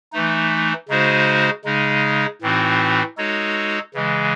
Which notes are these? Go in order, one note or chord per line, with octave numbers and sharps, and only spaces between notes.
E3 A3 D#4
C#3 G#3 D#4 F#4 C5
C#3 G#3 D#4
A2 E3 C4 D#4 F#4
G#3 D#4 F#4 A4 C#5
C#3 E3 G#3